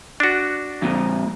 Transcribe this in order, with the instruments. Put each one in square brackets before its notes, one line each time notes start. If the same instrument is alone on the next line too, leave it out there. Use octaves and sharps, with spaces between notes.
[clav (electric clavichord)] D4 F#4
[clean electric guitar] F2 A#2